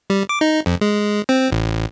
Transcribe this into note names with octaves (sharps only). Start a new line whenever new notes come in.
G3
D6
D#4
F2
G#3
C4
A1